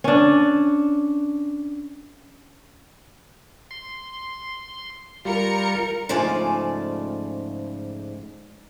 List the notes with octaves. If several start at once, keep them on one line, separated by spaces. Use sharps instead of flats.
C#4 D4
C6
G3 F4 A#4 C#7
G#2 C#3 F3 A3 D5 G#5